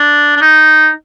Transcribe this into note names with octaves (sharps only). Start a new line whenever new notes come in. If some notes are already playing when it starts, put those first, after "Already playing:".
Already playing: D4
D4
D#4